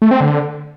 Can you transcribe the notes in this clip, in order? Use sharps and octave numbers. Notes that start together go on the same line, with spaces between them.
A3
C4
D3